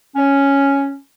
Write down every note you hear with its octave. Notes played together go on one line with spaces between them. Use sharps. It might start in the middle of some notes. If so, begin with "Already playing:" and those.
C#4